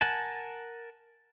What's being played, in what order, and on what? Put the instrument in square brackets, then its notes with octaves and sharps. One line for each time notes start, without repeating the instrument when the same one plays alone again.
[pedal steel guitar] A#4 F#5 G#5 A5